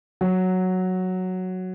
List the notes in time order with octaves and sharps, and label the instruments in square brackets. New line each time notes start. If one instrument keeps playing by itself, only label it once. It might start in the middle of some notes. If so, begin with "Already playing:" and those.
[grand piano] F#3